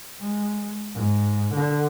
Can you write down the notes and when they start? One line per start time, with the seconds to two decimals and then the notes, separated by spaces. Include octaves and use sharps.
0.21 G#3
0.94 G#2
1.54 D3